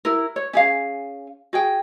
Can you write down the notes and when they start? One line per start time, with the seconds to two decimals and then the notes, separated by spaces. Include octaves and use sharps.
0.05 E4 A#4
0.36 C#5
0.53 C#4 G#4 F5
1.53 F#4 G#4 G5